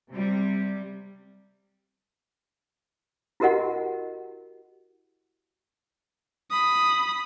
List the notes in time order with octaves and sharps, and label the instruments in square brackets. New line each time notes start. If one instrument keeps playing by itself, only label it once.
[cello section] C3 G3
[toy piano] E4 F#4 G4 A#4 D#5 F#5
[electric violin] B5 D#6